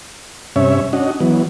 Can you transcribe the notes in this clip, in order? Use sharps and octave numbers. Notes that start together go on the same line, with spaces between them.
G2 C3 C#4 C#5 E5
C#4 D4 F#4 D#5
E3 F#3 B3